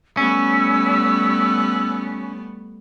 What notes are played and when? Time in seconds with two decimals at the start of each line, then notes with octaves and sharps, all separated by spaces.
0.17 G3 A3 B3 C#4 E6